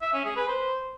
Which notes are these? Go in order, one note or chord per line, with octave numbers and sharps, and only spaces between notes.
E5
C#4
G#4
B4
C5